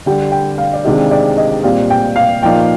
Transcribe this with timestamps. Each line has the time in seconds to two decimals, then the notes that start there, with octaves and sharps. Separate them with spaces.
0.06 D3 G3 D4 G5
0.32 G5
0.58 F5
0.73 D5
0.85 C3 D#3 G#3 D4 G4 D#5
1.11 D5
1.38 D#5
1.63 A#2 G3 C4 F5
1.90 G5
2.16 F5
2.43 A#2 F3 A#3 D#4 G5